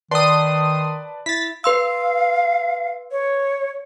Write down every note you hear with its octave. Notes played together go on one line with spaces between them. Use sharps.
D#3 B4 D5 A5 C6 D#6
E4 A6 B6
B4 F5 C6 E6
C#5